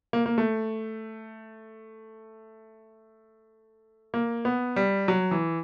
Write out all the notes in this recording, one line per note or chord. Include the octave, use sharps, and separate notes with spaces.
A#3
A#3
A3
A#3
B3
G3
F#3
E3